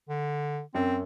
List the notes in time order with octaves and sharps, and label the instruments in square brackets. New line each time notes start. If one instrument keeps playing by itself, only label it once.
[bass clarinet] D3
[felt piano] F#2 [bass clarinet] C4